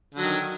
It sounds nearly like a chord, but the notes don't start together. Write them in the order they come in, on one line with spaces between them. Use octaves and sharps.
D3 F#3 D#3